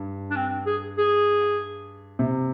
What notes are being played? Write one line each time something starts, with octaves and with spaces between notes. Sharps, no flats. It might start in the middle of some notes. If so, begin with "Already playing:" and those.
Already playing: G2
D4
C4
G#4
G#4
C3